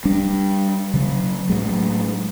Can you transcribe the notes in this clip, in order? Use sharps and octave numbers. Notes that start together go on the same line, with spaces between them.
G3 D4
C#3 F#3
A2 F#3 G#3